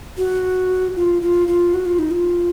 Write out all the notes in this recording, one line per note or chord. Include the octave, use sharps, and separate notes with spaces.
F#4
F4
F4
F4
F#4
F4
D#4
F4